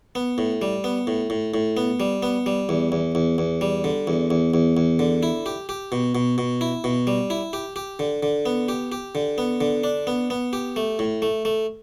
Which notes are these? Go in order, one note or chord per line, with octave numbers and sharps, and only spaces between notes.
B3
A2
G3
B3
A2
A2
A2
B3
G3
B3
G3
E2
E2
E2
E2
G3
D3
E2
E2
E2
E2
D3
E4
G4
G4
B2
B2
B2
E4
B2
G3
E4
G4
G4
D3
D3
B3
G4
G4
D3
B3
D3
D4
B3
B3
G4
A3
A2
A3
A3